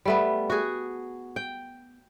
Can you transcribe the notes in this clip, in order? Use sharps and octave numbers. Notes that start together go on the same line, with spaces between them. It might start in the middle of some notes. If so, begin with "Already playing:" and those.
G3 A3 B3
F#4 G#4
G5